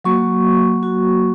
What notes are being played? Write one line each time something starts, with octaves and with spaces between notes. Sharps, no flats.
F#3 A#3 F#4 C#6
F#4